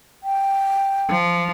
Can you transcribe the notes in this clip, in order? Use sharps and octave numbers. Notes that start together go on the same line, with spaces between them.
G5
F3